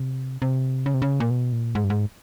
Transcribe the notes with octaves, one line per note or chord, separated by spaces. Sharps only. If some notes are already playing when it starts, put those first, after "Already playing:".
Already playing: C3
C3
C#3
C3
C#3
A#2
B2
A#2
G#2
G2
G#2